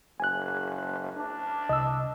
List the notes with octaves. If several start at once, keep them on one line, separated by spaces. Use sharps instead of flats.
F#1 G#5 F#6
D4
C2 D#5 E6